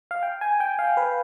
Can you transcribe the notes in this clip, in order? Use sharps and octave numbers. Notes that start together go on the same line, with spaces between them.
F5
G5
G#5
G5
F5
B4